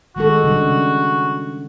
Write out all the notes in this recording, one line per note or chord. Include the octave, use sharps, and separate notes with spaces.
D#3 G#3 F#4 A4
C#3 G3 D4